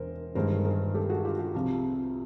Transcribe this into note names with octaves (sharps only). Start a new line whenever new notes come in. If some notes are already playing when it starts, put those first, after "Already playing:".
Already playing: E1 A#4 C5
G1 G2 D#3 G#3 A#4 C5
G#4 A#4
G4 A4
F#4 G#4
F4 G4
F4 G4
C2 C3 F3